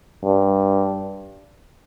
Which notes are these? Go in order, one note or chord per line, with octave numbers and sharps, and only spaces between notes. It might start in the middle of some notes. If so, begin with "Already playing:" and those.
G2